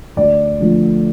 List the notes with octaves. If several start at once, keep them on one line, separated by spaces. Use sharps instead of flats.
D2 D5
D3 F3 A3